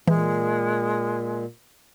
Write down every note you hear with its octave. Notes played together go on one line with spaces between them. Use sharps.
A#2 E3 G#3